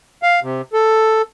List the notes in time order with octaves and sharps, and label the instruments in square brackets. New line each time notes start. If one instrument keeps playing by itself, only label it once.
[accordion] F5
C3
A4